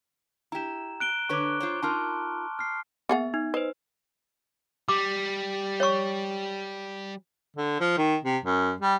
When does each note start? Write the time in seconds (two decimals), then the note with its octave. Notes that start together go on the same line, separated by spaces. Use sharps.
0.52 E4 G4 A#5 E7
1.00 F#6 D7 G7
1.29 D3 B4 C#5 C#6 D6
1.60 F4 C5 C#5
1.83 D#4 F4 A#4 A5 C6 F6
2.59 F6 C7
3.09 A#3 B3 G#4 E5 F#5
3.34 D#4
3.54 B4 C5 D#5
4.88 G3 D6
5.80 C#5 C#6
7.56 D3
7.80 F3
7.98 D#3
8.24 C3
8.45 F#2
8.81 G3